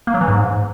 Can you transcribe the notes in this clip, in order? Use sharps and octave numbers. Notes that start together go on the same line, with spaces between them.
A#3
F#3
E3
G#2